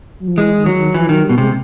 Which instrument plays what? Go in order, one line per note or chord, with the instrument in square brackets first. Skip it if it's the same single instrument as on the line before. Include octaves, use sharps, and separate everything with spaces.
[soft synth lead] F#3
F3
[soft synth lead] E3 [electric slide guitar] G#3
[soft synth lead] D#3
[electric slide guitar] F#3
[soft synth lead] D#3
[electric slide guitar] E3 [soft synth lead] F3
[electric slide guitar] D#3 [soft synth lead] F#3
[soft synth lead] G3
[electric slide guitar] B2
[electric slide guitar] C3 [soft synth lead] G#3